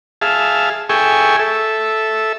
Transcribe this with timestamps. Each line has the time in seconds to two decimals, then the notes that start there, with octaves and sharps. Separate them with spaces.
0.22 G#4 E5 F5 A5
0.89 G#4 A4 E5 G5 G#5 C#6
1.39 A4 E5